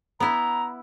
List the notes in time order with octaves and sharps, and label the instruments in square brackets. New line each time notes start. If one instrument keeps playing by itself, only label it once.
[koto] B3 E4 [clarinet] A#5